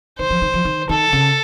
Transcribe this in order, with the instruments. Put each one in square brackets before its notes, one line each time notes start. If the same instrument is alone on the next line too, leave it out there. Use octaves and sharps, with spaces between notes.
[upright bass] D#3 [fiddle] C5
[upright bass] F3
D#3
F3
D#3
[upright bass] D#3 [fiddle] A4
[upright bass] C#3